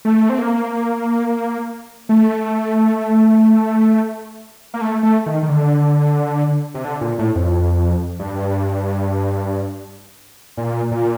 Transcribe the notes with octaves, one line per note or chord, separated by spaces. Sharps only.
A3
C4
A#3
A3
A#3
A3
A3
D#3
D#3
D3
C3
D3
A#2
A2
F2
G2
A#2
A#2